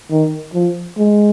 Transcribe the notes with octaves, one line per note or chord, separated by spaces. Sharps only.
D#3
F3
G#3